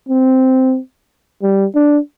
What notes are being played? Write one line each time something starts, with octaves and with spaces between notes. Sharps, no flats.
C4
G3
D4